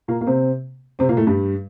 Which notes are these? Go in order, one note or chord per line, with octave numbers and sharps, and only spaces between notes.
A#2 A#3
A#3
C3 C4
C3 C4
A#2 A#3
A2 A3
G2 G3